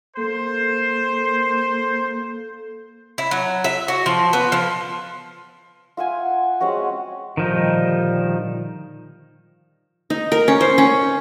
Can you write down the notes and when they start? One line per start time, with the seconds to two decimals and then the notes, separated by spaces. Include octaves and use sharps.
0.17 A#3 A4 C5
3.18 E4
3.31 F#3
3.64 E5
3.88 F#4
4.06 F3
4.33 B3
4.52 F3
5.97 F4 E5 F#5 G#5
6.60 G#3 C4 C#4 F#4
7.37 A#2 D3 D#3 F3 G3 D#4
10.10 D#4
10.32 A#4
10.48 C#4
10.61 C5
10.78 C#4